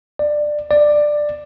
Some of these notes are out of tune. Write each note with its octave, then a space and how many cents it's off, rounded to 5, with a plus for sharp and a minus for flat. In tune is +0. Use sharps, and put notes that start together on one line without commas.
D5 +15
D5 +10